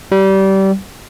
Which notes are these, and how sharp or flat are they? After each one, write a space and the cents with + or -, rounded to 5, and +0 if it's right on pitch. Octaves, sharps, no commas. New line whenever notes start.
G3 -25